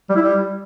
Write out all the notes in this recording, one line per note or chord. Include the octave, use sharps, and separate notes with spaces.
G3
E4
G3